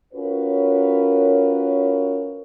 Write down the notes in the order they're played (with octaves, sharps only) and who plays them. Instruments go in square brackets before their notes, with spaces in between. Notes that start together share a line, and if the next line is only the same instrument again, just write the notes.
[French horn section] C#4 F4 F#4 A#4 B4 C#5